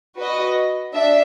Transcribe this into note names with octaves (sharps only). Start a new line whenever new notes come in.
F#4 B4 D#5
D4 E5